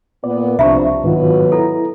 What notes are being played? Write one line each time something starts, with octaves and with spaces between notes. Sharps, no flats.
A#2 B3 D5
C2 C3 F3 D4 E5 A#5 C#6
G#2 B2 D#3 F#3 F4 B4
E4 A4 A#5